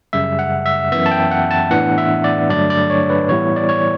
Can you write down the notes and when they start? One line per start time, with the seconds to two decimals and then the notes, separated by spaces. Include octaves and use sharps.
0.13 F#2 C#3 G3 E5
0.39 F#5
0.66 E5
0.92 F#2 E3 B3 E5
1.06 A5
1.11 G5
1.31 F#5
1.51 A5
1.70 A2 E3 B3 D4 F#5
1.98 E5
2.24 D5
2.49 G2 D3 F#3 A3 D4 D5
2.70 D5
2.90 C#5
3.10 B4
3.28 A2 E3 G3 B3 E4 C#5
3.56 D5
3.69 C#5